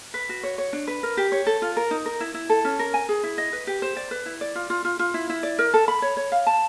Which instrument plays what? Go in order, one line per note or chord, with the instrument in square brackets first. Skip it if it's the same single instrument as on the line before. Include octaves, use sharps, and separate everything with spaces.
[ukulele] B4
F#4
C#5
C#5
D4
B4
A#4
G4
C#5
A4
F4
A#4
D#4
A#4
E4
E4
A4
C#4
A#4
G#5
G#4
E4
D#5
B4
G4
C5
D5
B4
E4
D5
F4
F4
F4
F4
E4
E4
D5
A#4
A4
B5
C#5
C#5
F5
A5